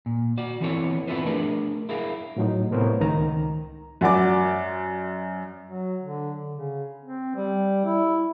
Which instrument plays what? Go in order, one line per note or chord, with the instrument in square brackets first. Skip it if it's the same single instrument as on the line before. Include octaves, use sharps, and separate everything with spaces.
[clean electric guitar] A#2
F#4 D5
E3 B3 C4 E4 A4 C#5
B3 C4 E4 F4 B4 C5
A3 D4 G#4 A#4 D5
E4 G#4 A#4 F5
[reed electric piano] A2 F#3 D#4
A2 C3 B3 A#4 C5 C#5
C#2 D#3 A#5
[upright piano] F#2 F#4 D5 D6
[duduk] F#3
D3
C#3
C4
G3
E4